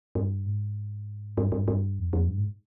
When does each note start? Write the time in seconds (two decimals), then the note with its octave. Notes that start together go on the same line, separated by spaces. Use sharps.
0.15 G2
0.46 G#2
1.37 G2
1.52 G2
1.68 G2
1.99 F2
2.13 F2
2.28 G2
2.38 G#2